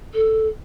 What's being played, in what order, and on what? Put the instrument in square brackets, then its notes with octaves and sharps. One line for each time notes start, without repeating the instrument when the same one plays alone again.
[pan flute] A4